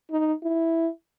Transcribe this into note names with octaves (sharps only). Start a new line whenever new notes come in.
D#4
E4